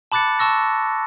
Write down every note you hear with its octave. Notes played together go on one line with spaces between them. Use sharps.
A5 B5 D6 F#6 A6 C#7
A5 C#6 E6 A#6